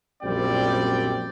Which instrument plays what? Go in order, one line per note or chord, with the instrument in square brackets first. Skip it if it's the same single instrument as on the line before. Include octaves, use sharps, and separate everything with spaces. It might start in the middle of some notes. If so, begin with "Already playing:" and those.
[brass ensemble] A#1 F#2 G3 C4 D5 G5